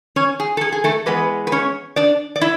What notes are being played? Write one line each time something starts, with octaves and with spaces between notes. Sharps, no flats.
C#4 C#5
G#4
A4
G#4
G#4
A3 A4
E3 G#3 B3 B4
B4
C#4 C#5
D4 D5
D5
E4 E5